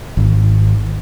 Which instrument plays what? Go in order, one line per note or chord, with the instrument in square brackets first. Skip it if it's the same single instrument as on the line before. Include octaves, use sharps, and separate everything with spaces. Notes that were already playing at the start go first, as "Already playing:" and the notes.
[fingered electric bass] G#1